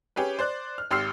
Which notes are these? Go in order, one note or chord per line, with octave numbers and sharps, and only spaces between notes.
C#4 G4 G#4 B4
C5 D5 F#6
F6
G#1 G4 C6 E6 F6 C7